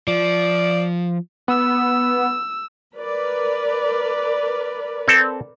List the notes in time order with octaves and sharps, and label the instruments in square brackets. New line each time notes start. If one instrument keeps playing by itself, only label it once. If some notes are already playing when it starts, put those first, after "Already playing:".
[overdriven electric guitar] F3 [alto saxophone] D5
[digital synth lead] B3 [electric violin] E6
[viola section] A#4 B4 D5
[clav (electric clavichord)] C4 A4